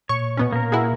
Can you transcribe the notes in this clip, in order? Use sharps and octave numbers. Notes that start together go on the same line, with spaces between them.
A#2 C#5 C#6
B2 B3 C#4
A#3 A#4
E4 F#4 G#4